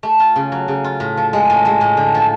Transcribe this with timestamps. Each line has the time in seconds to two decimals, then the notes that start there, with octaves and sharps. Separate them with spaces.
0.03 A3
0.20 F4
0.36 C#3
0.52 F#3
0.68 C#3
0.84 F4
1.00 A2
1.17 F3
1.33 G#3
1.50 A2
1.65 G#3
1.81 A2
1.97 D3
2.14 F3